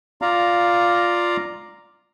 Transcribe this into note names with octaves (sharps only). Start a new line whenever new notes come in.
F4 D5 F5 A#5